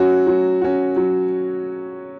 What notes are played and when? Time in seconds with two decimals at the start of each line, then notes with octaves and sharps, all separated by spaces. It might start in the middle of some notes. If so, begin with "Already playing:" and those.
Already playing: F#3 C#4 F#4
0.26 F#3
0.61 C#4 F#4
0.96 F#3